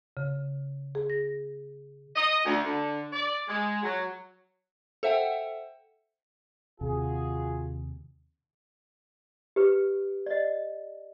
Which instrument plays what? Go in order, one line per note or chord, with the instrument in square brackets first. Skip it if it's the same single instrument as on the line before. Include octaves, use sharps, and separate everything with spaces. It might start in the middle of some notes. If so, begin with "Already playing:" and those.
[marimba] C#3
G#4
A#6
[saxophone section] D#5
D2
D3
D5
G#3
F#3
[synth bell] A4 C5 E5 F#5 G5
[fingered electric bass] D#2 C3 [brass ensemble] F4 F#4 G#4
[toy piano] G4 B4
D5 D#5